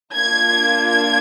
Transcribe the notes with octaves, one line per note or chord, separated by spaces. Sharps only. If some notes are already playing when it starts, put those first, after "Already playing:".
A#3 D4 F4 G#6
G#6